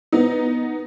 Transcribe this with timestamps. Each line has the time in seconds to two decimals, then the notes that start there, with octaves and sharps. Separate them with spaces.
0.12 B3 D#4